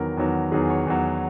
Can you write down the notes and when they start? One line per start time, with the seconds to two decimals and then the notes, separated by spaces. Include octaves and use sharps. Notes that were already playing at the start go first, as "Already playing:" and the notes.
Already playing: E2 D#3 F#3 A#4
0.17 E2 D#3 F#3
0.52 E2 D#3 F#3 G#4
0.70 C#5
0.87 E2 D#3 F#3